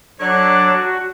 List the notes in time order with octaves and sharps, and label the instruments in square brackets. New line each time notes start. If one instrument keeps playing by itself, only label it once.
[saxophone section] D3 C#5 D5 [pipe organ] F#3 [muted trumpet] D4
[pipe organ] F#4